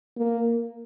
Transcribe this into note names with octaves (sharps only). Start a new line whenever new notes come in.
A#3